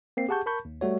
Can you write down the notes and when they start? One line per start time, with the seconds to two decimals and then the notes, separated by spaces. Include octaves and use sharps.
0.17 A#3 C4 C7
0.29 G4 G#4 F#5 A5 C#6 G6
0.46 A#4 A5 B5 C#6 G6
0.65 D#2
0.81 G3 A3 F#4 C#5